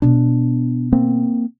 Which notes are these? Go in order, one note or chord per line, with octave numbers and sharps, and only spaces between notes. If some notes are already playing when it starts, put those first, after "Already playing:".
B2 B3 D4
A#3 C4